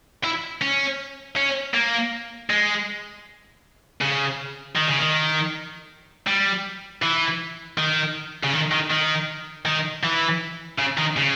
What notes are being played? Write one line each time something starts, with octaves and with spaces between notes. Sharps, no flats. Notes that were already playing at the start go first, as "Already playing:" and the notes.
E4
C#4
C#4
A#3
G#3
C#3
D#3
C#3
D#3
G3
E3
D#3
C#3
D#3
D#3
D#3
D#3
E3
C#3
D#3
C#3